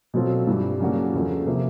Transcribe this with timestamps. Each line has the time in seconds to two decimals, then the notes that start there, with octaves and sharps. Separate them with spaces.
0.14 B2 F#3 A3 C4 F4
0.47 G2 E3 G3
0.80 C#3 F#3 A#3 D4 F#4
1.14 E2 C#3 F3 A3
1.46 C3 F3 A#3